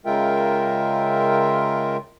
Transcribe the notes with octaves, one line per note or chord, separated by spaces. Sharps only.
C#3 G#3 F4 A#4 E5 G5